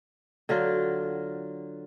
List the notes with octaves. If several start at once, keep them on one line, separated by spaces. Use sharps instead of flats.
D3 F#3 F4